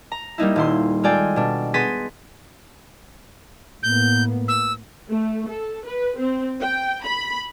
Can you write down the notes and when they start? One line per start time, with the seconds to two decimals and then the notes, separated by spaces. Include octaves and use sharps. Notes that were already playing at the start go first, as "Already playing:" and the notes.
0.12 A#5
0.38 G3 A#3 D#4 E4
0.56 D#1 E4 C6
1.03 G#3 F4 A4 D5 G5 G#5
1.36 B2 D4
1.74 B3 G#4 C6 A6 B6 D#7
3.83 A2 A#3 B3 G6
4.48 E6
5.10 A3
5.48 A4
5.85 B4
6.18 C4
6.62 G5
7.04 B5